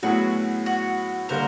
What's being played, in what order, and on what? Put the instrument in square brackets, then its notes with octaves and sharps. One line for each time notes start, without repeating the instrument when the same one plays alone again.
[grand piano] A2 F#3 B3 E4 G#4 [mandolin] F#4
[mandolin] F#4
[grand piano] D3 G3 A#3 [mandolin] A#4 C5